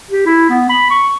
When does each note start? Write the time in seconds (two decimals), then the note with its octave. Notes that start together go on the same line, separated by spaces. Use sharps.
0.10 G4
0.26 E4
0.50 B3
0.69 B5
0.90 C#6